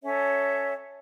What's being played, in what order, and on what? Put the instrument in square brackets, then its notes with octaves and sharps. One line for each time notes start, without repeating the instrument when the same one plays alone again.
[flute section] C#4 A4 C#5 E5